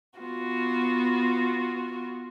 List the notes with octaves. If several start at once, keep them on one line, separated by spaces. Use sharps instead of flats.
B3 F4 F#4